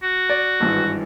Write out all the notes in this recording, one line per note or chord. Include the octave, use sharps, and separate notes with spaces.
F#4
D5
G#1 G2 E3